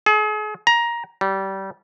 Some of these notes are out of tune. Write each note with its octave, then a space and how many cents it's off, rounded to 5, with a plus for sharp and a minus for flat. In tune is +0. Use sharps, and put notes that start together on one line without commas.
G#4 +40
A#5 +15
G3 -25